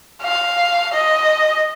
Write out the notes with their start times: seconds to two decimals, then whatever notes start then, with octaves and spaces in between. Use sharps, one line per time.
0.22 F5
0.94 D#5